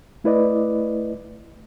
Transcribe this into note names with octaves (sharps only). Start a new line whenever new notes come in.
A3 E4 B4 D5 D#5